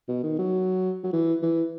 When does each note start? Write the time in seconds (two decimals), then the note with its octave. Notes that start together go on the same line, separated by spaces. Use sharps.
0.08 B2
0.23 D#3
0.39 F#3
1.04 F#3
1.13 E3
1.42 E3